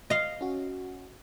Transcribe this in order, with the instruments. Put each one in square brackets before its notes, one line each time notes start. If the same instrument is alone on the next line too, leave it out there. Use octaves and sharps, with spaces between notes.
[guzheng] D#5 F5
[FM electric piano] C#4 F#4